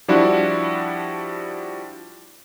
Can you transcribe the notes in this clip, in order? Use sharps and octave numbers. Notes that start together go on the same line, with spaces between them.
F3 G3 D4 E4 F#4